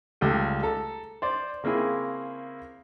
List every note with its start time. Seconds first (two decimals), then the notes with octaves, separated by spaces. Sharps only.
0.21 C#2 G3 A3 G5
0.63 A4 A#5
1.22 C5 D5
1.64 C#3 A#3 C4 E4 G#4